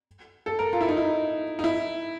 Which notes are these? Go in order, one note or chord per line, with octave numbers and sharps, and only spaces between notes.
A4
A#4
F4
E4
D#4
E4
D#4
E4